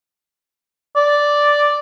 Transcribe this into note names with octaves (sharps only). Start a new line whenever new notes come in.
D5